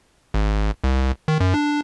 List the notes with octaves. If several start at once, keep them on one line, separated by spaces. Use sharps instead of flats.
G#1
C2
D#3
F#2
D4